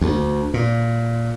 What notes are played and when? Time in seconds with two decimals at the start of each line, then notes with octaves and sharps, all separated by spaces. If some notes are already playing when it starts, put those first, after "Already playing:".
0.01 D2
0.54 A#2